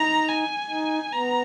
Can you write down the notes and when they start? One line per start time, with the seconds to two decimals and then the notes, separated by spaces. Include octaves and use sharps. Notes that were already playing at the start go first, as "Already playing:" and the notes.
Already playing: D#4 A#5
0.28 G#5
0.70 D#4
1.13 B3 A#5